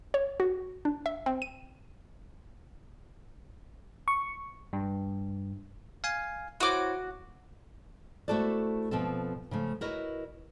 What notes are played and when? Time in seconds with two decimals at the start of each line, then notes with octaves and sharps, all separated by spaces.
0.14 C#5
0.40 F#4
0.85 D4
1.06 E5
1.26 C4
1.42 D#7
4.08 C#6
4.73 G2
6.04 F5 G#5
6.60 E4 F#4 C5 C#5 D6
8.28 A3 E4 F#4 A4 C5 D5
8.91 B2 F3 C4 A4
9.51 C#3 F3 A3
9.81 E4 F#4 A#4 B4 C#5 D#5